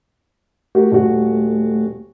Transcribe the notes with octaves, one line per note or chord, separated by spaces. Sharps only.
A3 F#4 G4 A#4
D#1 F#4